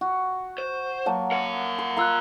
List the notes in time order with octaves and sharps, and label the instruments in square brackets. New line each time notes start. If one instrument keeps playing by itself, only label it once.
[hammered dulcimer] F#4
[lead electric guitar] C5
[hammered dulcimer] F#3 A#3 A5
[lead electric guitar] A#4 F#5
[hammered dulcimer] C6
[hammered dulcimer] F4 F5 [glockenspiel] A#5 E6 F#6